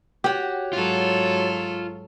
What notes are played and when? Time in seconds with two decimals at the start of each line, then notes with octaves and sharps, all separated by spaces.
0.24 F#4 G4 C#5 F#5
0.73 G#2 F#3 F4 A4